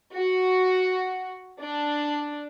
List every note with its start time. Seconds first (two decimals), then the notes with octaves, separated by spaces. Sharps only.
0.15 F#4
1.60 D4